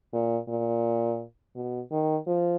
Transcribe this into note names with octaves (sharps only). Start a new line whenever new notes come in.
A#2
A#2
B2
D#3
F3